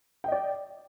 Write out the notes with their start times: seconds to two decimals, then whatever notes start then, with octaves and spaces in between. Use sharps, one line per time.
0.24 G5
0.28 D#5
0.32 D5